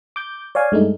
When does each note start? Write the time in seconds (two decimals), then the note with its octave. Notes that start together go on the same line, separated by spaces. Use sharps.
0.16 D6 G6
0.55 C#5 D5 F5 G#5
0.72 G2 G#3 A3 D#4